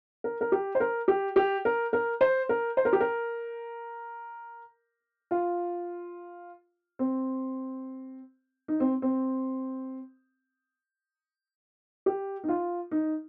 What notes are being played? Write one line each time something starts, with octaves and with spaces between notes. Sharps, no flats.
A#4
A#4
G4
C5
A#4
G4
G4
A#4
A#4
C5
A#4
C5
A#4
G4
A#4
F4
C4
D#4
C4
C4
G4
D#4
F4
D#4